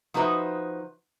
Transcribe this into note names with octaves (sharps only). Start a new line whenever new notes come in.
F3 D#4 F#4 B4 C5 E5